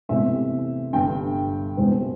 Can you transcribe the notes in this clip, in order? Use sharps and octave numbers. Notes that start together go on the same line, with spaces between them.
E2 C3 E3 A3 E5
G1 G2 D3 G5
E1 E2 C3 G3 C4